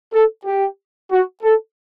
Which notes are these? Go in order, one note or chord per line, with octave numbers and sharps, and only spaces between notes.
A4
G4
F#4
A4